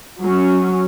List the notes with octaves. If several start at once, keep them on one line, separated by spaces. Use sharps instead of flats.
F#3 C#4